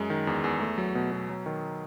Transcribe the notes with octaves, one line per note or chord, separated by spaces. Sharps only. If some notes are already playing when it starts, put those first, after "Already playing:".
Already playing: F#2 G#3
D#3
E2
E2
A3
F#3
B2
B2
F#3
D#3